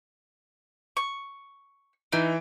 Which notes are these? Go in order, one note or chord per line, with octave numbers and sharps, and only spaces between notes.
C#6
E3 D#4 E5 D7